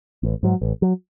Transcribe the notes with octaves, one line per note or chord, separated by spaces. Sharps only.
A1
G#2 F#3
A1
F#3